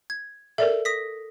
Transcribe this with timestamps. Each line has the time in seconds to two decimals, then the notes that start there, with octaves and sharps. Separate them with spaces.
0.10 G#6
0.58 A4 A#4 D5 E5
0.85 D#6 A#6 B6